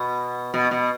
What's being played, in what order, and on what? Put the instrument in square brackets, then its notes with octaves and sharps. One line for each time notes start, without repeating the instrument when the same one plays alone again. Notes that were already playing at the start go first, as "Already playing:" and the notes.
Already playing: [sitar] B2
B2
B2